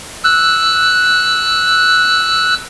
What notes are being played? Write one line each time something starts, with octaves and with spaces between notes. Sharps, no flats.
E6 F#6